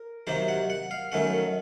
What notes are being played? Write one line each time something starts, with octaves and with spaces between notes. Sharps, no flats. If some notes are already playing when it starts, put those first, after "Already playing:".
Already playing: A#4
C3 D#3 F#3 A#3 C5
F#5
F#5
F5
F#2 D#3 A3 C#4 F#5